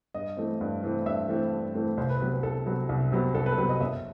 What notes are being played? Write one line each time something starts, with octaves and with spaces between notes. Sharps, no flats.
G2 D#5
E3 A3 C4
G2
E3 A3 C4
G2 E5
E3 A3 C4
G2
E3 A3 C4
C2 C5
B4
C3 F#3 B3 B4
B4
C2 A4
C3 F#3 B3
C2
C3 F#3 B3
C2 A4
B4
A4
C3 F#3 B3 B4
D#5
F#1 E5